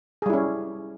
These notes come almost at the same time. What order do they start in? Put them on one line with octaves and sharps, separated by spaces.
G#4 G3 E4 C#4